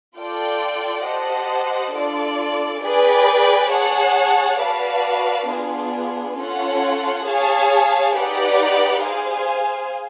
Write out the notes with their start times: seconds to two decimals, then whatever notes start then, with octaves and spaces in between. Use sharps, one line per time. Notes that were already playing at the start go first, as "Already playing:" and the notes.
0.16 F4 A4 D5 G5
1.05 G4 C5 D#5 F#5 A5
1.94 D4 F4 A4 D5
2.83 G#4 B4 D5 G5
3.72 G#4 C#5 F#5 A5
4.60 F#4 B4 D5 F5 A5
5.49 B3 D4 F4 G#4
6.38 C#4 F4 A4 C#5 F#5
7.26 G#4 C#5 F5 A5
8.16 D#4 G4 B4 D5 F#5
9.04 G#4 C5 F5 G#5